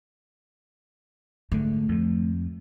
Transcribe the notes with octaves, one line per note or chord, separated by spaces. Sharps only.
G#2 D3 A3
F2 F3